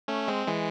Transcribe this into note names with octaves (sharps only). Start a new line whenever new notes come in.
A3 C#4
G#3 C4
E3 G#3